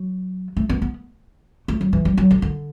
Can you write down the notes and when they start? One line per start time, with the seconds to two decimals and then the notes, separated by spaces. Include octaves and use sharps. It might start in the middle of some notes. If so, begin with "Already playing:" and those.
Already playing: F#3
0.57 A3
0.69 B3
0.82 B3
1.68 A3
1.81 F#3
1.93 E3
2.05 G3
2.17 F#3
2.31 D3
2.42 D3